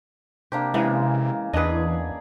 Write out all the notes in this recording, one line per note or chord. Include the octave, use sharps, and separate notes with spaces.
C3 A#3 D4 G4 C5
C#3 E3 G#3 A#3
E2 E3 D4 G#4 B4 D#5